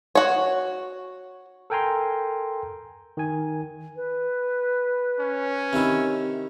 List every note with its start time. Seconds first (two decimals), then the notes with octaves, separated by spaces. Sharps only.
0.15 F#4 C#5
1.70 A4 A#4 G5 G#5 A#5 C6
3.17 D#3 G#5
3.96 B4
5.19 C#4
5.73 C3 D#3 E4